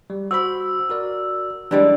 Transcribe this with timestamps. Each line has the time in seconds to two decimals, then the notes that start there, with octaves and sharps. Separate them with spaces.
0.10 G3
0.31 F#4 C5 B5 E6
0.90 F#4 A#4 D5
1.71 D3 E3 G3 G#3 D4 D5